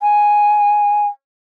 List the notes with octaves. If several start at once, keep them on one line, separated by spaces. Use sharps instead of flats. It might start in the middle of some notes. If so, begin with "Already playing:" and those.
G#5